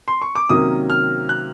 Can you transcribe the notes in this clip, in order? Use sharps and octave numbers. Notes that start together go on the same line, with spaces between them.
C6
C#6
D6
C3 D#3 F#3 A#3 C#4 D#6
F6
F#6